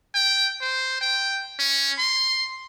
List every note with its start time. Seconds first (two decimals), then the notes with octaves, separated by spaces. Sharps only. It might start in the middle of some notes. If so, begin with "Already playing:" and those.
0.15 G5
0.61 C5
1.01 G5
1.59 C#4
1.99 C6